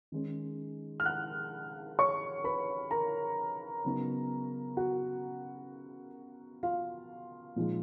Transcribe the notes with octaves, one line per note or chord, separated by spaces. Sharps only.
D#3 G#3 C#4
F6
F#5 F#6
C#5 C#6
B4 B5
A#4 A#5
C#3 F#3 B3 D#4
F#4 F#5
F4 F5
A#2 F3 G#3 D#4